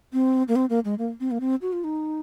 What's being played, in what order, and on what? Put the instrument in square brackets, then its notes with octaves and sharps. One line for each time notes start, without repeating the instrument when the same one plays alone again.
[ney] C4
A#3
C4
A#3
G#3
A#3
C4
A#3
C4
F#4
F4
D#4